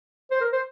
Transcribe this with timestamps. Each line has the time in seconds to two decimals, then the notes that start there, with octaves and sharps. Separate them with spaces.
0.31 C5
0.41 A#4
0.52 C5